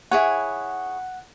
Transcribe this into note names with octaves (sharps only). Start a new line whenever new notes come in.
E4 G#4 C#5 F#5